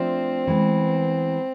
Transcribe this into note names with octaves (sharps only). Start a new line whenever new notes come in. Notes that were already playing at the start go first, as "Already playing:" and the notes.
Already playing: F3 A3 C4 D4
E3 G#3 B3